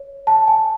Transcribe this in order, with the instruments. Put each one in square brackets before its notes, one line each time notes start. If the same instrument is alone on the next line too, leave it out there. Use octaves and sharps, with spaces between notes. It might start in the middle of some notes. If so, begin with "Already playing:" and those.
Already playing: [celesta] C#5
A5
G#5